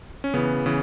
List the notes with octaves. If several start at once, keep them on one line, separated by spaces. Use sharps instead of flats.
C#4
C#3 E3 B3
C#3 E3